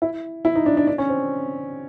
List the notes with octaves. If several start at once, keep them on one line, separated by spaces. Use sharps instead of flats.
E4
E4
D#4
D4
D4
D4
C#4
C4